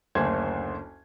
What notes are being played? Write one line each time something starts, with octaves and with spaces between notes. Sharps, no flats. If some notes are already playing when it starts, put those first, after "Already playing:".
F#1 D2 C5 G#6